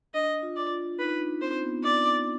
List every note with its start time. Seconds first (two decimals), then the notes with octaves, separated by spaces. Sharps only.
0.14 D4 D#5
0.42 F4
0.56 D5
0.70 F4
0.99 D#4 B4
1.20 D4
1.41 C4 C5
1.62 B3
1.84 D5